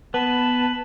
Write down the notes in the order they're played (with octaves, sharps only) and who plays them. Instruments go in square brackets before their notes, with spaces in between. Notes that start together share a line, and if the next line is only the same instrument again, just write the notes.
[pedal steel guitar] B3 [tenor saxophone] B4 [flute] A5